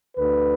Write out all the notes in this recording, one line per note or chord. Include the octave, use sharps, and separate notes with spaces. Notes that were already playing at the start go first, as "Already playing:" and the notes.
D2 D3 B4